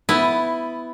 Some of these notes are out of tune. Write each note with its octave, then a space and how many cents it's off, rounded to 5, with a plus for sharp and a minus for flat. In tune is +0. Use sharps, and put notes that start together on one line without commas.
B3 +15 E4 +0